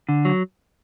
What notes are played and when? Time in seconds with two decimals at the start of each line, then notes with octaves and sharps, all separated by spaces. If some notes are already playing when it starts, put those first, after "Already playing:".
0.09 D3
0.25 F#3